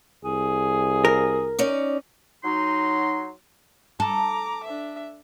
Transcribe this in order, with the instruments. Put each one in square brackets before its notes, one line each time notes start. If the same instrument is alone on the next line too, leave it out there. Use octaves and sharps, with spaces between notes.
[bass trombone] C2 [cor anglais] G#4
[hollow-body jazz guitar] A#4
[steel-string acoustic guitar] C#4 D#4 D5
[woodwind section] F#3 D#4 C6
[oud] A4 [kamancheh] A#5 D6
[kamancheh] D4 E5